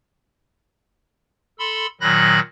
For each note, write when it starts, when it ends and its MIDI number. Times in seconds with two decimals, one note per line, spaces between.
1.59 1.86 69
1.59 1.86 83
1.59 1.86 84
1.59 1.86 88
2.01 2.40 46
2.01 2.40 51
2.01 2.40 54
2.01 2.40 83
2.01 2.40 90
2.01 2.40 94